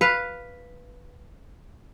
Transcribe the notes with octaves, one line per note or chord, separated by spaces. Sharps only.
B4 F5